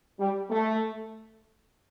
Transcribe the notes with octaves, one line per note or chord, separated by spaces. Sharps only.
G3
A3